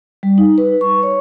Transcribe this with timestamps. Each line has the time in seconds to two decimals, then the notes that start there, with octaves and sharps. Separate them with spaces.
0.23 G3
0.38 D#4
0.58 B4
0.81 C#6
1.03 C#5